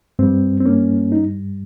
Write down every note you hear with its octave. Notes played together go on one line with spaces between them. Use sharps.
G2 G3 C4
C4
A#3 C#4
D#4